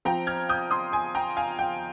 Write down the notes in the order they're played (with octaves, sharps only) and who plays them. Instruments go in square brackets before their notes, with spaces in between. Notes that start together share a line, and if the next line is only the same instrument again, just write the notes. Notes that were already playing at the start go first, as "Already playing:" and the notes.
[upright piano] F3 C4 G5 A#5
F6 G#6
D#6 G6
C6 D#6
G#5 C6
G5 A#5
F5 G#5
G5